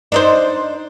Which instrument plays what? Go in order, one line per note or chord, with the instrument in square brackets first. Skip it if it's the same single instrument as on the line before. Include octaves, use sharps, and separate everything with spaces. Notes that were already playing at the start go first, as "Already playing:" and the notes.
[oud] D4 D#4 C5